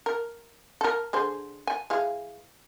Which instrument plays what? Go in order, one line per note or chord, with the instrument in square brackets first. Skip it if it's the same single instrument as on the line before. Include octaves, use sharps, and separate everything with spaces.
[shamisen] A#4
A4 A#4
D3 G#4 C5
G#5
E3 G#4 F5